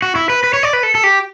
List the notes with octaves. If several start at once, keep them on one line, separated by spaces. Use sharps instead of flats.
F#4
E4
B4
B4
C#5
D5
B4
A4
A4
G4